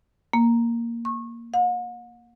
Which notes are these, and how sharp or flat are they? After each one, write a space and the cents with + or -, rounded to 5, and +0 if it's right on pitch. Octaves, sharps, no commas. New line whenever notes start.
A#3 +0
C#6 -25
F#5 -45